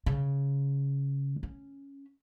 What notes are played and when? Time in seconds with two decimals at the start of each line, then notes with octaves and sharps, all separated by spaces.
0.06 C#3
1.43 C#4